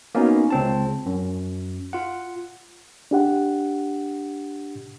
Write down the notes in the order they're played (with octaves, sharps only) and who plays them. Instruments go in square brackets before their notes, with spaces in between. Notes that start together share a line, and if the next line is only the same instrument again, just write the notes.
[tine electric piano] A#3 B3 C#4 D#4 F#4
C#2 C4 A5
F#2
F4 F#5
[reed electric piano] D4 G4 F#5